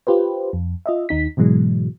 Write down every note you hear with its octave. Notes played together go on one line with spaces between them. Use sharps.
F4 G4 B4 C5
F2
F4 D#5 E5
D#2 D#4 B6
G#2 B2 E3 F#3 G#3